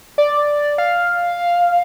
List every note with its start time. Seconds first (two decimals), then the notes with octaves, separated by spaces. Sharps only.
0.18 D5
0.78 F5